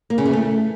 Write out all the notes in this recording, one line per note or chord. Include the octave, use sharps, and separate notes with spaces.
A#3
C#3
E3
A3